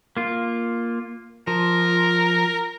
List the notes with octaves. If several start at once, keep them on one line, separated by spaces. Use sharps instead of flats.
A#3 F4
F3 A#4